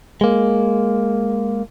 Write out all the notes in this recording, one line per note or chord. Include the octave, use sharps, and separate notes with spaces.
G#3 A#3